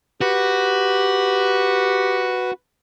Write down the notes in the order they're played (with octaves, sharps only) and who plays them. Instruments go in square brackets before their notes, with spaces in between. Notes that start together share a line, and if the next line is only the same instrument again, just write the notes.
[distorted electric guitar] F#4 [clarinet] G4 [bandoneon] B4